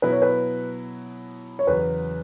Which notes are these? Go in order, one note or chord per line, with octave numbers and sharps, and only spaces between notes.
B2 F#3 B3 E4 B4
C#5
B4
C#5
E2 C#3 F#3 B4